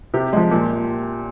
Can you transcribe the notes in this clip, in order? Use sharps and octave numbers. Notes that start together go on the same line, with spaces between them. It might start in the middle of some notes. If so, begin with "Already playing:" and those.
C3 G4
F3 G#3
A#2